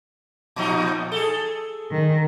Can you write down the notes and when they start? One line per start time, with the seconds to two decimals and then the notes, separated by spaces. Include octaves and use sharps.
0.56 A#2 F3 D#4
1.12 G#4 A4
1.91 D#3